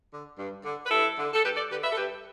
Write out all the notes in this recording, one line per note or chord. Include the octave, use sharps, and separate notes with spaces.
D3
G2
D3
B4
G2 E4 A4
D3
A4
G2 G4 B4
A4 D5
D3 G4 B4
B4 E5
A4
G2 G4 B4